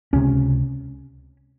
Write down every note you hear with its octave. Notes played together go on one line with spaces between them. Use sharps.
C#2 C3 C#4